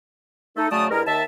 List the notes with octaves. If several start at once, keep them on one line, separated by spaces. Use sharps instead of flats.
A3 D#4 A4
C#3 F#3 A3 D5 A5 D#6
G2 G#3 E4 A#4
D#2 E5 A5